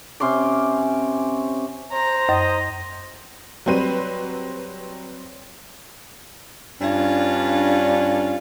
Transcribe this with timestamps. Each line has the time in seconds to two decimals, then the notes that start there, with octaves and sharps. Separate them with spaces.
0.20 C3 C#4 C6 D6
1.92 C5 A#5
2.29 F#2 D#5
3.66 F#3 G3 C4 B4 D#7
6.81 G2 C#4 D4 F4